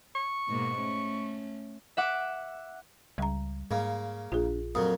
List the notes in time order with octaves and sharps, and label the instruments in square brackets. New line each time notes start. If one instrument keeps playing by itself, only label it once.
[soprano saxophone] C#6
[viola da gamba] G#2 B2 A#3
A3 C#4
[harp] E5 F#5 D6
[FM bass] C#2 [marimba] G3 A#5
[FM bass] G#2 [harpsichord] C#3 A#3
[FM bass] A#1 [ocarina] D4 [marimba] F4 G#4
[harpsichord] F2 A#2 F#3 [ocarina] A#4 [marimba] D#6